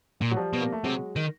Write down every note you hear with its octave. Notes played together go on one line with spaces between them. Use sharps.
A#2
F#3
F3 G3
B2
A#3
A3
C3 F#3 G#3
D#3